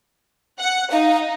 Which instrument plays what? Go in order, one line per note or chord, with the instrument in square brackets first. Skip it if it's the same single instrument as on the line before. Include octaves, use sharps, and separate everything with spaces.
[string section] F#5
[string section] D#4 [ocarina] F5